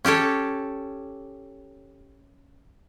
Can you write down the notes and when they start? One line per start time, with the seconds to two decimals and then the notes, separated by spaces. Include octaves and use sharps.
0.05 C#4 G4 A4 C#5